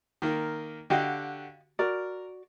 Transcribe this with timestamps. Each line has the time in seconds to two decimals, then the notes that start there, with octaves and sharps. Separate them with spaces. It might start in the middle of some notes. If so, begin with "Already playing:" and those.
0.22 D#3 A#3
0.90 D3 F#4 G4 D#5 F5 G5
1.79 F#4 A#4 D5